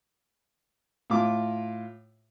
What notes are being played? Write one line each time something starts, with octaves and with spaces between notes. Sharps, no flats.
A2 F4 D6